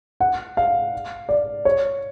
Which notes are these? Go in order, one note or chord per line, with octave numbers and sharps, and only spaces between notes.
F#5
F5
D5
C#5